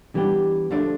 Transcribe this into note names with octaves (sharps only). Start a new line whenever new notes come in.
E3 G3 B3 D4 G4
D2 D3 F3 A3 D4